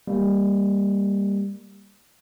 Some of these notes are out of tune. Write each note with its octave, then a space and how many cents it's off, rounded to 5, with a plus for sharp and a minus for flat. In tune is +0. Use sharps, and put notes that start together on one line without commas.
G3 +20 A#3 +0